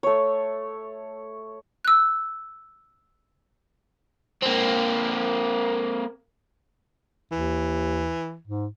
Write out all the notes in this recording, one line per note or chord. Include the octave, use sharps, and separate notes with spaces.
A3 C#5
E6 F#6
A#3 C4
D#2 E3
G#2